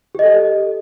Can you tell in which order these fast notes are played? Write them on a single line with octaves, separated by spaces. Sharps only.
G4 D#5 A4